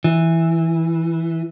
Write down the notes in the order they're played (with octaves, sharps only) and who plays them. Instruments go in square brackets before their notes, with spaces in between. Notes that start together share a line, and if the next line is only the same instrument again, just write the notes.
[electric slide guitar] E3